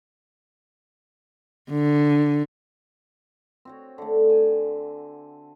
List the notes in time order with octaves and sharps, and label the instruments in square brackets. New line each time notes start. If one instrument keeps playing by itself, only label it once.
[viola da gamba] D3
[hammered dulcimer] C4 F#4 C#5
D3 A3
G#5